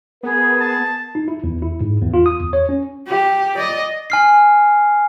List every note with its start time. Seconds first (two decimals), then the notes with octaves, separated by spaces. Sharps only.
0.23 B3 G#4 A#4
0.60 A5
1.15 D#4
1.28 E4
1.44 E2
1.62 E4
1.81 G#2
2.02 E2
2.14 F4
2.26 D#6
2.40 E2
2.53 C#5
2.69 C#4
3.08 G4
3.57 D5 D#5
4.10 G#5 F6 C7